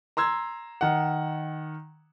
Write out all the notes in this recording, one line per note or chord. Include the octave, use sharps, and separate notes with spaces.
A#5 C6 E6 G#6
D#3 F#5